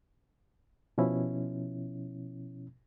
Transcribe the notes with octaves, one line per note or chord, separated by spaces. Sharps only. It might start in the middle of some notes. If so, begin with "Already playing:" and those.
B2 F3 C#4 E4